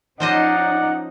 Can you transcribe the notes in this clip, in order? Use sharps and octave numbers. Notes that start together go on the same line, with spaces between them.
F3 C#4 D#4 C5 D5 D#5 F#5